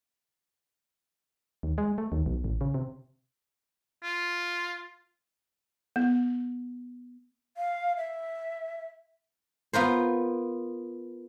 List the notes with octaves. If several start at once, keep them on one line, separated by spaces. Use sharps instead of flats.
D#2
G#3
A3
D#2
B1
A1
C#3
C3
F4
B3
F5
E5
B3 F4 A#4 C5